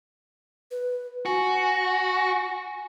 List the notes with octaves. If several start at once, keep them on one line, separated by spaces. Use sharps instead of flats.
B4
F#4 G#5